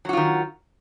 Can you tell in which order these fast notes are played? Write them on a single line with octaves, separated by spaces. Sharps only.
F#3 F#4 F4 D#3